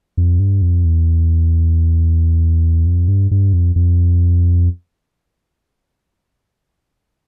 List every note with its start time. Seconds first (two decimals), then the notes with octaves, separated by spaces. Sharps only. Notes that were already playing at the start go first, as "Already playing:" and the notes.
0.17 F2
0.39 G2
0.62 F2
0.85 E2
2.86 F2
3.08 G2
3.31 G2
3.53 F2
3.76 F2